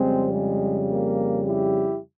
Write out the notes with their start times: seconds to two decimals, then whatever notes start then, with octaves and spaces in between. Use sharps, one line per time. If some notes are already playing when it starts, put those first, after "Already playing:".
Already playing: F2 C#3 G3 G#3 C4
0.32 G#3
0.89 A#3
1.46 E4 G4